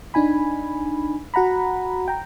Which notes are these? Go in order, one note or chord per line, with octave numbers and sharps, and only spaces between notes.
D4 D#4 G#5 B5
F#4 F#5 A#5 B5
G5 A#5